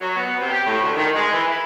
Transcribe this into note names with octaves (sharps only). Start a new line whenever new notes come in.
F#3
B3
C3
G4
A2
D2
D#3
G#3
E3
E4